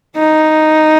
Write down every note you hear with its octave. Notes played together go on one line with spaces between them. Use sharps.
D#4